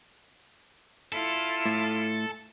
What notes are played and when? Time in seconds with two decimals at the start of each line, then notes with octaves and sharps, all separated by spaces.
1.12 E4 F4 A4
1.66 A2